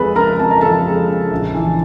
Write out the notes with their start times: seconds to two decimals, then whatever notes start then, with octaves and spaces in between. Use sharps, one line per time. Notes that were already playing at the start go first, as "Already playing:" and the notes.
Already playing: F2 F3 G#3 G#4 A4 B4 B5
0.16 C#3 A#4 A#5
0.39 F2 A5
0.51 A#5
0.61 F3 A4 A5
0.86 G#3
1.08 C#3
1.31 A#1
1.54 E3